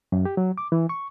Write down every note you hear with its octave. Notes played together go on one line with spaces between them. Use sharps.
F#2
G4
F#3
D6
E3
C#6